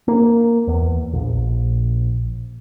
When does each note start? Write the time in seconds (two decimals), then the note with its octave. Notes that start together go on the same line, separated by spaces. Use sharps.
0.08 A#3
0.67 E2
1.13 A#1